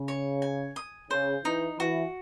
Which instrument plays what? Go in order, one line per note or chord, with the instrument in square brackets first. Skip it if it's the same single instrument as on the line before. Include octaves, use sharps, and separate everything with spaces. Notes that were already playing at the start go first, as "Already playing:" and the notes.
Already playing: [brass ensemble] C#3
[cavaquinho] C#5
G#5
D#6
[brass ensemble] C#3 [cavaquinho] C5
[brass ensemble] E3 [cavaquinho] D#4
[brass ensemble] E3 [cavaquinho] F#4